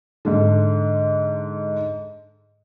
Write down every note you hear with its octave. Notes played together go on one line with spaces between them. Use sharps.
G#2 D3